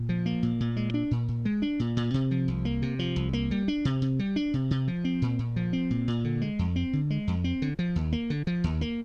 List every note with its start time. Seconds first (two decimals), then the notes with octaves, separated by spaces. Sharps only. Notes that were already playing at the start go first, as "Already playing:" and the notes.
Already playing: A#2
0.09 F3
0.26 A#3
0.43 A#2
0.60 A#2
0.77 G#3
0.94 D4
1.11 A#2
1.28 A#2
1.45 G#3
1.62 D4
1.80 A#2
1.97 A#2
2.14 C3
2.31 F3
2.48 C2
2.65 A#3
2.82 C3
2.99 F3
3.16 C2
3.33 A#3
3.51 G3
3.68 D4
3.85 C3
4.02 C3
4.19 G3
4.36 D4
4.54 C3
4.71 C3
4.88 F3
5.05 C4
5.22 A#2
5.39 A#2
5.56 F3
5.73 C4
5.91 A#2
6.08 A#2
6.24 D3
6.42 G#3
6.59 F2
6.76 C4
6.93 D3
7.10 G#3
7.27 F2
7.44 C4
7.62 D3
7.79 F3
7.96 D#2
8.13 A#3
8.30 D3
8.47 F3
8.64 D#2
8.81 A#3